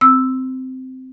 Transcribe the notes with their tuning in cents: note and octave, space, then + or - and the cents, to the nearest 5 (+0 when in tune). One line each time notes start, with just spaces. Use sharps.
C4 -15 E6 +0